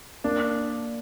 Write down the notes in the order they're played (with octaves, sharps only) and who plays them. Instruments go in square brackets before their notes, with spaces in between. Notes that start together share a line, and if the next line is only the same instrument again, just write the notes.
[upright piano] A#3 [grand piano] D4